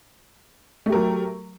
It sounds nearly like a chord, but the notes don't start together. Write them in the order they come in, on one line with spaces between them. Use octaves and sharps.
A3 G4 A#4 F#3